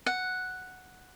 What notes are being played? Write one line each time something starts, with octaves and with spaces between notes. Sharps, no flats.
F#5